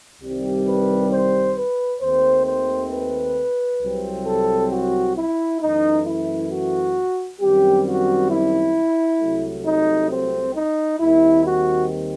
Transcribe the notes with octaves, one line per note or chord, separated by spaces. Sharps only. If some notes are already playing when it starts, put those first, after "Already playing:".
C2 C3 D#3 G3 C4
B4
C5
B4
D#2 D#3 A3 C4 C5
C5
B4
C2 C3 F#3 C4
A4
F#4
E4
F#2 E3 A3 D#4
E4
F#4
F#2 D#3 G3 C4 G4
F#4
E4
C2 C3 F#3 A3
D#4
C4
D#4
D#2 D#3 G3 C4 E4
F#4